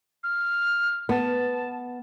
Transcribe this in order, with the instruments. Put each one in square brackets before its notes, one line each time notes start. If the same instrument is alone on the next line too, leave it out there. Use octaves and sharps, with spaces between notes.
[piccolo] F6
[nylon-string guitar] B3 [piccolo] A5